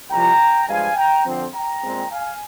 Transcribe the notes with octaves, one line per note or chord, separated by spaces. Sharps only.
C2 C3 F3 G5 A#5
G2 F3 G#3 F5 G#5
G5 A#5
F2 D3 F3 C4
G5 A#5
A#2 G#3 C4
F5 G#5